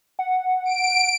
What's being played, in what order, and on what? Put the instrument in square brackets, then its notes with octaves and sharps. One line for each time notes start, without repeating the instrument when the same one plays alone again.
[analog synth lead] F#5
[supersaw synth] D7